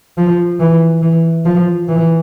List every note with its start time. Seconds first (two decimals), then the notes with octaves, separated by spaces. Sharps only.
0.17 F3
0.60 E3
1.02 E3
1.46 F3
1.88 E3